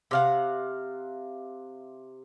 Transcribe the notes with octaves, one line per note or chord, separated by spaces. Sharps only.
C3 F5 F#5